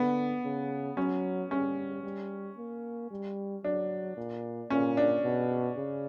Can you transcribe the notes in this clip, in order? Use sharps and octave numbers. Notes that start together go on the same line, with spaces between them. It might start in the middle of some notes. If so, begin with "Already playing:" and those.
Already playing: D3 B3
C#3
F#3 C#4
G3 C#4
G3
A#3
G3
F#3 D4
A#2
A#2 C#4
D4
B2
C#3